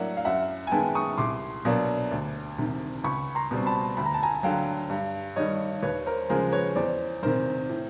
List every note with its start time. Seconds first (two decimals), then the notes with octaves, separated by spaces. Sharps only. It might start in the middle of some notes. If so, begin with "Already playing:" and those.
Already playing: A2 F#3 A#3 D4 E5 F#5
0.17 F5
0.25 F#2 E5 F#5
0.67 G#5
0.71 D#3 G#3 B3 G5 A5
0.95 C#6 D#6
1.17 C2 C6 D6
1.65 B2 F#3 A#3 D4
2.12 D2
2.58 C3 D#3
3.04 C#2 B5 C#6
3.35 A#5 C6
3.51 B2 G3 C4
3.66 A5 B5
3.97 D2 B5
4.06 A#5
4.14 A5
4.23 G#5 A#5
4.43 D3 F#3 F5 G5
4.90 G2
5.36 D#3 G3 C#5 D#5
5.83 D#2 B4 C#5
6.06 A#4 C5
6.29 C#3 F3 G#3 A#4 C5
6.52 B4 C#5
6.76 E2 C5 D5
7.23 C3 D#3 A#4 C5
7.69 A2